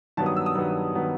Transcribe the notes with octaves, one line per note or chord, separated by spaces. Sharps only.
G2 D#3 F#3 B3 A5
D#6
E6
D#6
G2 D#3 F#3 B3
D#3 F#3 B3